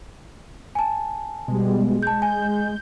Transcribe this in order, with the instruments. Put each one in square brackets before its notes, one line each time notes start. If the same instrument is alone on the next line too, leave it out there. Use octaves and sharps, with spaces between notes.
[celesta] G#5 A5
[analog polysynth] B2 G3 [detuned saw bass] G#3
[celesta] A5 G6
[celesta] G#5 [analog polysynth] G6